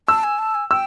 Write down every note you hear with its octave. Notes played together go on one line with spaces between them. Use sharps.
A5 E6
G#5
A5
G#5
G5 E6